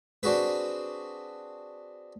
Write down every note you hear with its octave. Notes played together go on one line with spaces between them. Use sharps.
C4 D4 F#4 G#4 B4